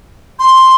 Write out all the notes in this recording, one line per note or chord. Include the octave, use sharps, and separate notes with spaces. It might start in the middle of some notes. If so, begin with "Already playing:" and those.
C6